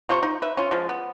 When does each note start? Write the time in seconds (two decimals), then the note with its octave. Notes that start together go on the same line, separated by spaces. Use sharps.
0.09 C3 F4 C5 C#6
0.23 D#4
0.42 B4 E5
0.57 C#4 F4
0.71 F3 G#3
0.89 B3